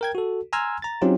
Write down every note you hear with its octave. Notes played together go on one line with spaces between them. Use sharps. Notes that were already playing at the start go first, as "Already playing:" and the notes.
A#4 G5 G#6
F#4 A4
G#5 A#5 C6 E6 F6 G#6
A#5 A6
F#3 C4 C#4 D#4 F4 G4